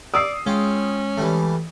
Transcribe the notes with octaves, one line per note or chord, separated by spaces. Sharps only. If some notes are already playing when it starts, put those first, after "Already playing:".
D5 D#6 E6 C7
G#3 C#4 F4 G5
E3 G3 A3